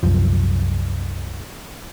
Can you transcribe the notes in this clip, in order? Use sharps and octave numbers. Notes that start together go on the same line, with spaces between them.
C2 F#2 F3